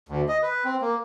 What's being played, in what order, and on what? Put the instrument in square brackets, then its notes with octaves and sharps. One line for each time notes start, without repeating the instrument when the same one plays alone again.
[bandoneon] D2
D#5
B4
C4
A#3